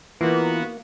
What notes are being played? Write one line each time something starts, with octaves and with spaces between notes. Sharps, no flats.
E3 A#3 B3 F4 F#4